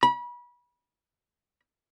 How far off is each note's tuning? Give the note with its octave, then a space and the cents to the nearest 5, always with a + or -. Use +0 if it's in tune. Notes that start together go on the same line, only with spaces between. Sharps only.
B5 -30